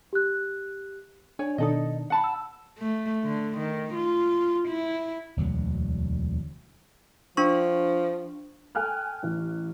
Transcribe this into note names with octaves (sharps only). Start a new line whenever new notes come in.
G4 F#6
D4 C#5 G#5
B2 D#3 D4 D#4 A4 D#5
F#5 A5 B5
E6
A3
D3
D#3
F4
E4
E1 D2 F#3
F3 D4 C#6
A4 G5 G#5 F6 F#6
A1